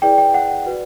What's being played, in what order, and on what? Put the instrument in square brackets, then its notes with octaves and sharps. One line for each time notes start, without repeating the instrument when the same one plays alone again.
[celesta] E4 G#4 B4 D5 G5
G5
F#5
F#4 B4 D5